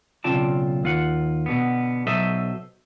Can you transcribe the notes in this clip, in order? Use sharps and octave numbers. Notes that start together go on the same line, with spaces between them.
B1 C#3 C4 F4 D5 A5
D#2 F4 F#5
B2 D3 B3
B1 F#3 A4 C5 D#5 E5